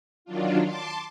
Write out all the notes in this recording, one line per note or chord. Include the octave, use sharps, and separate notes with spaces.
D#3 F#3 D4 F4
A5 C6 D6